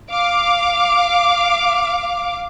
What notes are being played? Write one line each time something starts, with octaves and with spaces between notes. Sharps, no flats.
F5 D6